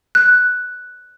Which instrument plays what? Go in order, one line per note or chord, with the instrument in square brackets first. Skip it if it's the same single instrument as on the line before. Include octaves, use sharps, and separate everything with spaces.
[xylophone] F#6